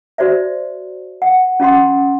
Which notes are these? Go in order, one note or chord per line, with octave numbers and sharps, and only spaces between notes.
F#4 C5 D5 E5
F#5
C#4 F4 F#5 C6